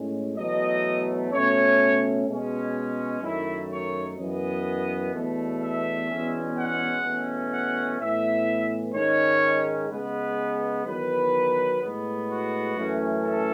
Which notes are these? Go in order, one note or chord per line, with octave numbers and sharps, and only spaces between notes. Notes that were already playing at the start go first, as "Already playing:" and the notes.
Already playing: A2 G#3 C#4
E2 B2 F#3 A3 D#5
B2 A3 C#4 C#5
B2 G#3 C#4
F#2 D#3 F#3 A3 E4
C#5
F#2 E3 B3 D#5
E2 B2 A3
E5
E2 B2 G#3 C#4
F#5
E2 B2 A3 C#4
F#5
A2 E3 B3 E5
G#2 D#3 G#3 C#4 C#5
C#3 G#3 B3 B4
E2 D#3 F#3 B4
A2 G#3 B3
F#4
F#2 E3 A3 C#4
A4